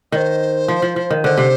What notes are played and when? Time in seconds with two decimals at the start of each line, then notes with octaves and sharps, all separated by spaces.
0.12 D#3 C5 D#5
0.68 F3
0.82 F3
0.96 F3
1.10 D#3
1.24 D3 C5
1.37 C3